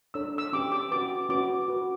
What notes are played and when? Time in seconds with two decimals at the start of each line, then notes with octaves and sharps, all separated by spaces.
0.14 D4 A4 C#5 E6
0.38 E6
0.53 C#4 G4 B4 D6
0.72 D6
0.91 C#4 F#4 B4 D6
1.29 C#4 F#4 B4 D6
1.68 F#4 B4